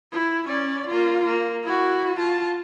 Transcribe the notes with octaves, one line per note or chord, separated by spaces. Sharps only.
E4
C#4 D5
A#3 F4
A#3
E4 F#4
F4 A5